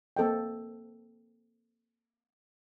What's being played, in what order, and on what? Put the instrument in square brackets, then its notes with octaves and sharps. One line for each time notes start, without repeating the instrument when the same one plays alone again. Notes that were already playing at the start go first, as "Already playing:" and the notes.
[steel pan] A#3 C4 A4 D#5 G5